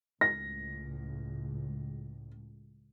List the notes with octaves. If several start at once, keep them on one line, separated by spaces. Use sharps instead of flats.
C#2 A2 A#6